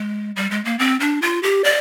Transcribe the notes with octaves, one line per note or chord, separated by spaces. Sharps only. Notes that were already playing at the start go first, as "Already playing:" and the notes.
Already playing: G#3
G3
G#3
A#3
C4
D4
F4
G4
D5